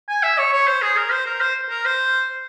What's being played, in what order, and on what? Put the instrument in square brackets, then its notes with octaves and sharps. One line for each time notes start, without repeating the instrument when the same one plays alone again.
[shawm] G#5
E5
C#5
C#5
C5
G#4
A#4
C5
A#4
C5
A#4
C5